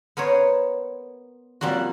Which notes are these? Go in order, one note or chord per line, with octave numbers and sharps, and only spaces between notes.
B3 A#4 C5 C#5
F3 G3 A#3 C4 F#4